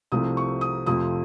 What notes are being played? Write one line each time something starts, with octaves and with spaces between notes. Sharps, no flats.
C2 C3 F3 A3 C4 D#6
C#6
D#6
F2 C3 F3 A3 C4 D#6